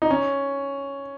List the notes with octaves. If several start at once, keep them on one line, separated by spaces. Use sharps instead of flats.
D#4
C#4